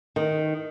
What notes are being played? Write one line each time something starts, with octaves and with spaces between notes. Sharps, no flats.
D#3